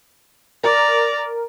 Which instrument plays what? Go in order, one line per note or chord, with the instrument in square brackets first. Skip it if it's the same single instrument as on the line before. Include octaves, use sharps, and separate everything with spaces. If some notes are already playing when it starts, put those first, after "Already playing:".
[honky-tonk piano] A#4 [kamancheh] D5 A#5